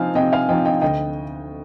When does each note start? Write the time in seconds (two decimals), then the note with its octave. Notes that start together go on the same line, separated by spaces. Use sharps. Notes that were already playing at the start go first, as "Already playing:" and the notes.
Already playing: C3 F3 C4 D#4 F5 G#5
0.15 C3 D#5 G5
0.32 F5 G#5
0.49 F3 C4 D#4 D#5 G5
0.65 D#5 G5
0.82 D2 D#5 G5